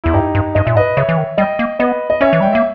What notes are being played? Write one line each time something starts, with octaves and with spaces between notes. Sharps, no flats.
E2 E4
G2 D#4 G4
G2
G2 D#5
A#2 E5
G#2 B4 D#5
C#3 C#5 E5
E3
D#3
G3 D#5 G5
A#3
B3 B4 D#5
D#5
C#4 C#5 E5
E3
G3 G5
G#3
A#3 E5